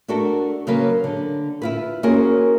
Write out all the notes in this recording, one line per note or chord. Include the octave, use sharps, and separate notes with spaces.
A3 D4 F#4 A4 A#4
C#3 F#3 A#3 A#4 B4
D3
E4 F4 B4
A#3 C#4 F#4 G#4 A#4 C5